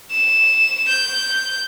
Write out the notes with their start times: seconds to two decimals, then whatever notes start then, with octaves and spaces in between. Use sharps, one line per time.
0.12 E7
0.88 G6